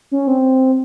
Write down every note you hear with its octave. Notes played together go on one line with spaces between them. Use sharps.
C#4
C4